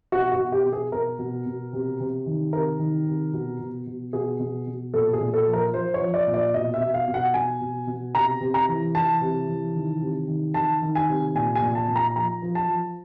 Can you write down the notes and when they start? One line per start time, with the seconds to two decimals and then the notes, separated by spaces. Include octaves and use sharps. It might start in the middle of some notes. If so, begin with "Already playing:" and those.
0.12 B2 F#4
0.32 F#4
0.39 B2
0.52 G4
0.66 B2
0.73 G#4
0.92 B2 A#4
1.19 B2
1.46 B2
1.73 C3
2.00 C3
2.26 D#3
2.53 C3 A#4
2.79 D#3
3.06 C3
3.33 B2
3.60 B2
3.87 B2
4.13 B2 G#4
4.40 B2
4.67 B2
4.94 A#2 A4
5.13 G#4
5.20 A#2
5.34 A4
5.47 F3
5.53 A#4
5.73 F3 C5
5.94 C#5
6.01 F3
6.14 D5
6.27 A#2
6.34 D5
6.54 B2 D#5
6.74 E5
6.80 B2
6.94 F5
7.08 B2
7.14 F#5
7.34 B2 G#5
7.61 B2
7.87 B2
8.15 C3 A#5
8.41 C3
8.54 A#5
8.68 E3
8.95 E3 A5
9.21 C3
9.48 E3
9.75 D#3
10.02 C3
10.28 D#3
10.54 D#3 A5
10.82 D#3
10.95 G#5
11.09 C3
11.35 A#2 G#5
11.55 G#5
11.62 A#2
11.75 A5
11.88 A#2
11.96 A#5
12.15 F3 A#5
12.42 F3
12.55 A5
12.69 F3